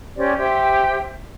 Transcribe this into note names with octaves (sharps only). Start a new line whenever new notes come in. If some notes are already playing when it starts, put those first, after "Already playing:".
C#4 G4 C5 D5
G4 C5 E5 G5